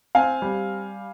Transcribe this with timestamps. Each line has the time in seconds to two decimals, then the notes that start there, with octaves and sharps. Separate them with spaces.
0.15 C4 F5 G#5
0.42 G3